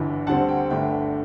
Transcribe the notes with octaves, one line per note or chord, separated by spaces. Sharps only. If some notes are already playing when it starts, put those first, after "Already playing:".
Already playing: G1 G2 E3
D2 D3 G3 C4 F#5 A5
G5
G1 G2 D3 A3 G5